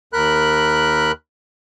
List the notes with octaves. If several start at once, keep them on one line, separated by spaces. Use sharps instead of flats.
D#2 A#4 B5 F#6